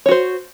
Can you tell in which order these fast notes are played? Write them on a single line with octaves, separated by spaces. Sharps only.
C#5 F#4 C5